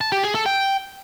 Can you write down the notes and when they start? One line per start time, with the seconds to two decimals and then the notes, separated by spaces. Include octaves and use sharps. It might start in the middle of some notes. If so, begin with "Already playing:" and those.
0.01 A5
0.12 G4
0.23 G#4
0.35 A4
0.46 G5